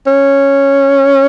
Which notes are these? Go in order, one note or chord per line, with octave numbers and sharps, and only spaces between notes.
C#4